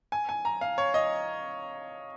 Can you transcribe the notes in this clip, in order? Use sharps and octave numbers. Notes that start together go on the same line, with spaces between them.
G#5
G#5
A#5
F5
C#5
D#5